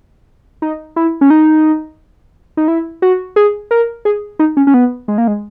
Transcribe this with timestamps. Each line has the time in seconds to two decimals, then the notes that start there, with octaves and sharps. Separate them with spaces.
0.62 D#4
0.96 E4
1.21 C#4
1.30 D#4
2.57 D#4
2.68 E4
3.02 F#4
3.36 G#4
3.71 A#4
4.05 G#4
4.39 D#4
4.57 C#4
4.67 C#4
4.74 B3
5.08 G#3
5.18 A#3
5.27 G#3